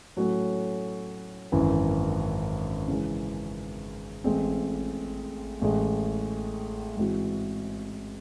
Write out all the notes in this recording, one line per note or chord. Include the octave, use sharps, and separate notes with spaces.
A2 F#3 C#4 F#4 A4
G#1 F#2 E3
C#3 E3 G#3
A1 A2 G#3 C4
A1 A2 G#3
G#2 E3 G#3 C4 F#4